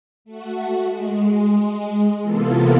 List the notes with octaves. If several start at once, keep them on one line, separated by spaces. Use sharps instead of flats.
A3 F#4
G#3
C3 E3 A#3 B3 F4 A4